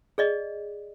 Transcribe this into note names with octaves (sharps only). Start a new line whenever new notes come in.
G#4 D5 D#5